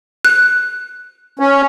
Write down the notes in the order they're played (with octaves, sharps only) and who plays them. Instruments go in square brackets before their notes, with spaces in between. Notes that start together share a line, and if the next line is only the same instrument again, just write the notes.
[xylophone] F#6
[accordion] C#4